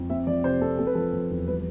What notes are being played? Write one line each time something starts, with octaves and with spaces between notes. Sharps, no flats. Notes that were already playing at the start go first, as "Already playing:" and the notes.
Already playing: F2
C4 E5
F3 D5
C3 C5
C4 A4
C4 A4
B4
F3 A4
F3
E2
G3 B4